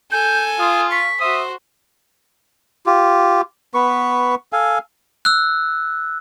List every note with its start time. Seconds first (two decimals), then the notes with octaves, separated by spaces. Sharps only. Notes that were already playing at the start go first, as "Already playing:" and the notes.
0.11 A4 G#5 G6
0.59 F4 D#6
0.91 C#6 B6
1.20 F#4 C5 E5 D#6
2.86 F4 G4
3.74 B3 B4 C#6
4.53 A4 F5 G#5
5.25 E6 F#6